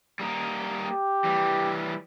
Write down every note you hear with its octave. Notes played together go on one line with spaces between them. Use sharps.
G3 A#3 D#4
G4
E3 G3